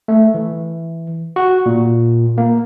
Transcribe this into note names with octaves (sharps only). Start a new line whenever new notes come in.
A3
E3
F#4
A#2
A#3